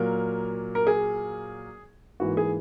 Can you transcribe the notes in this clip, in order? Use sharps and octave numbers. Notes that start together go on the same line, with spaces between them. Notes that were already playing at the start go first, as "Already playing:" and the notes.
Already playing: A#2 F#3 A#3 A#4
A#4
G#4
G#2 E3 A#3 F#4
G#4